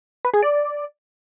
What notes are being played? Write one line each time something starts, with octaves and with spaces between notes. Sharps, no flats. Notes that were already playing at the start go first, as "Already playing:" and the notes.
B4
G#4
D5